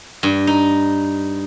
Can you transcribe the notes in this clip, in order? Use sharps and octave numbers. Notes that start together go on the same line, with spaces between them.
G2
D#4